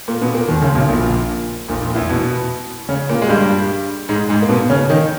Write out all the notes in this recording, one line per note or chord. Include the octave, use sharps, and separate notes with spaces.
A#2 A#3
B2 B3
A#2 A#3
D#2 D#3
C#2 C#3
B1 B2
A#1 A#2
A#1 A#2
A#1 A#2
E2 E3
B2 B3
C#3 C#4
A#2 A#3
G#3
G2 G3
G#2 G#3
G#2 G#3
A#3
B2 B3
C#3 C#4
D#3 D#4